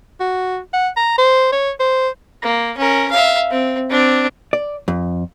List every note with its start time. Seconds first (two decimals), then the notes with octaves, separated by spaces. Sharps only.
0.20 F#4
0.73 F#5
0.97 A#5
1.18 C5
1.53 C#5
1.80 C5
2.43 A#3
2.77 C#4 A#4
3.11 E5 F5
3.51 C4
3.90 C4 D4
4.53 D5
4.88 F2